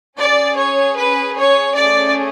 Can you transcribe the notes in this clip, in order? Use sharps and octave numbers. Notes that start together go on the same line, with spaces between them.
C#4 G#4 D5
C#5
B4
C#5
A3 C#4 G#4 D5